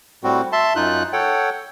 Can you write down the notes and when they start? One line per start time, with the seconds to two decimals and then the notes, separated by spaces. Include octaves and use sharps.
0.23 A2 G3 C4 F#4
0.53 E5 A5 C6
0.76 F#2 D#4 F4 F#6
1.13 A4 C#5 F#5 G5